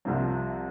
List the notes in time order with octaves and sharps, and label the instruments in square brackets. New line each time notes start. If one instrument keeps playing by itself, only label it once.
[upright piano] C2 C3 F3 C4